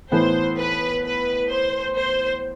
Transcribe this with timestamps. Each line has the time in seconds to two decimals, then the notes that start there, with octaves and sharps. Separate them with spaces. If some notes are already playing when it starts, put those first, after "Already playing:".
0.12 A2 E3 B3 E4 A4 C5
0.58 B4
1.04 B4
1.51 C5
1.97 C5